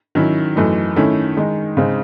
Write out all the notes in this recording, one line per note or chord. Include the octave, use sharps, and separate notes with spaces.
D#3 F#3 C#4 E4
F#2 E3 A3 D#4
D#3 A3 C#4 E4
D#3 G#3 D#4
C#3 G#3 C4 D#4